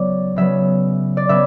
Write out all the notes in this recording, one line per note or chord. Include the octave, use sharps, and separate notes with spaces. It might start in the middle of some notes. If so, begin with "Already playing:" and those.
Already playing: C#3 F#3 B3 D5
C#3 F#3 B3 E5
D5
C#3 F#3 B3 E5